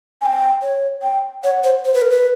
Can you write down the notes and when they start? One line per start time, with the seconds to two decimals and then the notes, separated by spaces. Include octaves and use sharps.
0.21 G#5
0.26 G5
0.62 C#5
1.02 G5
1.43 C#5 F#5
1.64 C5
1.85 C5
1.94 B4
2.02 A#4
2.10 B4